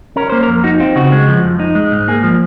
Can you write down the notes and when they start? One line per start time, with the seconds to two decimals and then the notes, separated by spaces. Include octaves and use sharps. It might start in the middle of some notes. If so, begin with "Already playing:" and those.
0.16 C#4 A#4
0.30 A#3 C5
0.43 A#4
0.48 F2
0.64 D#4 F#4
0.80 C4 F4
0.96 C#3 F#4
1.12 G#3
1.28 F3
1.44 F2
1.60 D#4
1.75 G#3
1.92 G#2
2.08 A#3 G#4
2.23 F3